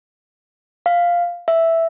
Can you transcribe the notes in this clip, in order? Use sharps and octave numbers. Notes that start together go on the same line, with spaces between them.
F5
E5